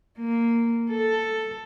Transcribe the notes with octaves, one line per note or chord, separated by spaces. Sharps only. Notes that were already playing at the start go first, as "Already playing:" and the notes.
A#3
A4